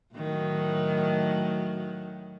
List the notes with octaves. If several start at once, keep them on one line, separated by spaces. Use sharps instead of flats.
A2 D#3 F#3